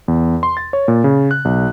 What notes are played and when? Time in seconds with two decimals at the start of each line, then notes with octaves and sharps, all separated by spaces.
0.08 E2
0.43 C6
0.57 A6
0.73 C#5
0.88 A#2
1.04 C#3
1.31 F#6
1.45 B1